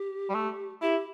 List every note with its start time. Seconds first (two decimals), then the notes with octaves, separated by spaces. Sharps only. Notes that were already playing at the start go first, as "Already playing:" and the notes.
Already playing: G4
0.29 G3
0.35 A3
0.81 E4 G4